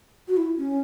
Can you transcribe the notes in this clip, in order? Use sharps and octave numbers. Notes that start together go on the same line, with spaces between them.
F#4
E4
C#4